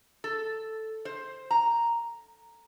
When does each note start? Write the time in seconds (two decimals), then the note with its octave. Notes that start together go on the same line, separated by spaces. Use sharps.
0.24 A4
1.05 C5
1.51 A#5